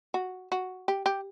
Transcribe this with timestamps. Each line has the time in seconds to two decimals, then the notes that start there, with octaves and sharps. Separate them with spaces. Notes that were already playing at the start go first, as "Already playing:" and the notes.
0.14 F#4
0.52 F#4
0.88 G4
1.06 G4